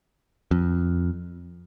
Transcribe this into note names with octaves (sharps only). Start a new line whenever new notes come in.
F2